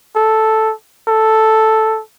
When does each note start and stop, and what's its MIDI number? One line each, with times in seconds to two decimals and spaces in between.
0.16 0.73 69
1.08 2.01 69